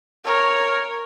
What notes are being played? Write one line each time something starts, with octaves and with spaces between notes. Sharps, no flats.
A#4 C#5